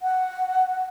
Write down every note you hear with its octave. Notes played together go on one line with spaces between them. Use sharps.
F#5